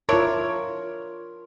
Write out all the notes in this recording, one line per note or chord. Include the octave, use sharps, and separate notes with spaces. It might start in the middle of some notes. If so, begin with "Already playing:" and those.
D4 E4 F4 A#4 C#5